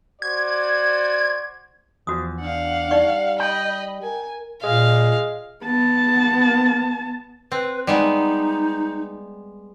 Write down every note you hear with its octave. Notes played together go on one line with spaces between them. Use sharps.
F#4 C5 D5 G#6
E2 F3 F#4 D#6
D4 F5 F#5
G3 D#4 D5 C#6
D#5 G5 B5
A#4 G#5
A#2 G#3 F5
B3 A5
C4 B4
G3 G#3 B3 D#4